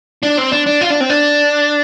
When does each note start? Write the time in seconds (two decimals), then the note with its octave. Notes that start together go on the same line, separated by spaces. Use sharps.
0.23 D4
0.38 C4
0.52 D4
0.67 D4
0.81 F4
0.90 D4
1.01 C4
1.10 D4